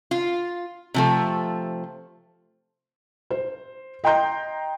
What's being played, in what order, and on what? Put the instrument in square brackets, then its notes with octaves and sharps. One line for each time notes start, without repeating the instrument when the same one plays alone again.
[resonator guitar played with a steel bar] F4
C3 F3 A3
[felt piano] C5
D#5 G5 A#5 C6 G6